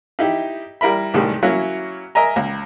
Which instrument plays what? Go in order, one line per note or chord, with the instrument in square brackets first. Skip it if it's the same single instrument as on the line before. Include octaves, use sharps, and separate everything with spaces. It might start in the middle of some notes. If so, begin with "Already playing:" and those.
[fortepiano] D#4 E4 G4
G3 E4 A#4 E5 B5
C2 A2 D#3 G3 G#3
F#3 A#3 C#4 E4
A#4 D#5 E5 G#5 A#5
C#2